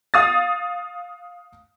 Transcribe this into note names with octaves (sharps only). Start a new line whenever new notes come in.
F5 D#6 A6